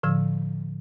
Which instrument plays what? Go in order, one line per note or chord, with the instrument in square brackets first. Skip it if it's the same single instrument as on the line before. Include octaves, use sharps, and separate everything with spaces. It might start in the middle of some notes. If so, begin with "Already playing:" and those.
[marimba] A2 D3 F3 E6